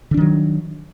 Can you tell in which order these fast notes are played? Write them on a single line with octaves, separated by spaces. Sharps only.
D3 D4 D#3 F#3